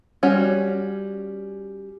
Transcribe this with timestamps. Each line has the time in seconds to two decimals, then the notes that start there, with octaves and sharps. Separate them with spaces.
0.23 G3 C#4 F#4